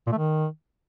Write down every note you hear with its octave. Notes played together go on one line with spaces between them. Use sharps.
A#2
A3
D#3